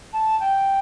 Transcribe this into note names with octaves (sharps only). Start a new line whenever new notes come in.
A5
G5